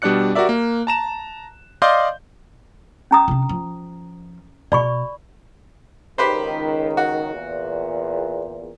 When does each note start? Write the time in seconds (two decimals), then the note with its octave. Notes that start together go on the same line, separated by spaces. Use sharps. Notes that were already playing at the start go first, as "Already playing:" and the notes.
0.02 B2 G3 D4 D5 F#6 C#7
0.35 F#4 G4 A#4 D5 E5
0.49 A#3
0.87 A5 A#5 E7
1.82 D5 D#5 F5 C6 D6 G6
3.11 C#4 A#5 D#6
3.28 C3 D4
3.49 F3
4.72 B2 D5 B5 C#6
6.18 C#2 D#3 G4 B4 C5
6.97 F#4
7.33 E2 A#2